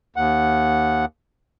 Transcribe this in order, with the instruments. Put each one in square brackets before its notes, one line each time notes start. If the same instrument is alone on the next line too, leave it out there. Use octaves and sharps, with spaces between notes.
[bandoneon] D#2 F#5